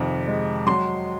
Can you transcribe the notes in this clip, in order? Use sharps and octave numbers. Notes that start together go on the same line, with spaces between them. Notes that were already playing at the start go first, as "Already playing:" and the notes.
Already playing: F2 C3 D#3
G#3
F#3 C6